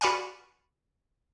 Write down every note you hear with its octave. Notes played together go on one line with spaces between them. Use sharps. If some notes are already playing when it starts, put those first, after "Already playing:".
F#4 B4 D5 F5 F#5 G#5